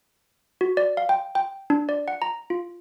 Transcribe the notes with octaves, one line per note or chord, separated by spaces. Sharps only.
F#4
D5
F5
G5
G5
D4
D5
F#5
A#5
F4